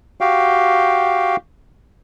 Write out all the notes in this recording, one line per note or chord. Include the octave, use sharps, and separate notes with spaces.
F#4 G4 F5 G5